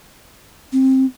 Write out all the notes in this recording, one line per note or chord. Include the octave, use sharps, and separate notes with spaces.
C4